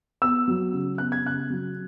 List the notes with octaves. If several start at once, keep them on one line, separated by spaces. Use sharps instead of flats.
B3 E6
F#3
C#3
B3 F#6
G#6
C#3 F#6
F#3